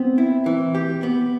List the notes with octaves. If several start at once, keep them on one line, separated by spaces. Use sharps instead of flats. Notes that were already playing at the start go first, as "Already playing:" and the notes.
Already playing: B3 C4
E4
E3
G4
B3